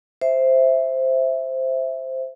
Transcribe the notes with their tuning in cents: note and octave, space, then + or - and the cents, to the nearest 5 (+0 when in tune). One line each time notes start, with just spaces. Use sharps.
C5 +0 E5 +0